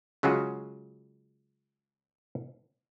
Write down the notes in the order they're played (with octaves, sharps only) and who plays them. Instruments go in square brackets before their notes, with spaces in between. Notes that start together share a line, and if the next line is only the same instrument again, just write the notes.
[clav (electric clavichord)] C#3 F#3 G#3 C#4 F4 F#4